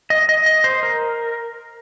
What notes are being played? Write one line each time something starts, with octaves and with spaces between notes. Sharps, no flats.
D#5
D#5
D#5
C5
A#4